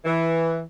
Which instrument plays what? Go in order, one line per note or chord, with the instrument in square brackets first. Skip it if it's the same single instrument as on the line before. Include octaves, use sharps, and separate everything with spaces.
[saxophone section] E3